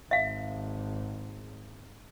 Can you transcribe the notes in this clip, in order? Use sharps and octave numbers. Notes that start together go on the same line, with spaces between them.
G#1 E5 F5